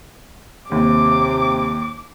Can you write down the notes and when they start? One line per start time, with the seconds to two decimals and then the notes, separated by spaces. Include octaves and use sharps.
0.72 D#2 C3 D6